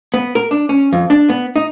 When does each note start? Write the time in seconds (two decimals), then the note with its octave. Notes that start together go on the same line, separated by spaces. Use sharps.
0.14 B3
0.35 A#4
0.51 D4
0.69 C#4
0.93 F2
1.10 D4
1.29 B3
1.56 D#4